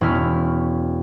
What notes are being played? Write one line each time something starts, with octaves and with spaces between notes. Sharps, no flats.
E1 C#4 E4 F6 B6